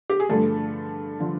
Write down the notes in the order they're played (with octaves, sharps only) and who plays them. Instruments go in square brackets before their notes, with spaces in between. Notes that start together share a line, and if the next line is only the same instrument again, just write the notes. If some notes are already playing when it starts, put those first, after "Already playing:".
[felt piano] G4
G#4
G2 D3 F3 A3 A4
D3 F3